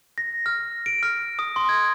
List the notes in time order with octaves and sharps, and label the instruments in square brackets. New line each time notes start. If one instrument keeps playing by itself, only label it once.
[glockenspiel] A#6
F6
D7
F6
D#6
C6
G#6